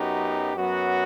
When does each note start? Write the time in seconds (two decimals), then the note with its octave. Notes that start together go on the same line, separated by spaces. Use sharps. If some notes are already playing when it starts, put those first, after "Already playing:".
Already playing: F#2 F#3 B3 D#4 G4
0.54 F#2 F#3 B3 F#4